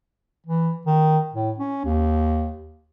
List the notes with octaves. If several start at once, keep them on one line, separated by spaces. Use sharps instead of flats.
E3
D#3
A2
C#4
D#2